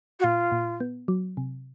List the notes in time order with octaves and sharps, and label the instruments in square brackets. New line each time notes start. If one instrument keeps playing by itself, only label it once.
[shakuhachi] F#4
[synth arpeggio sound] A#2 [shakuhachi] F4
[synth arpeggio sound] A#2
B3
F#3
C3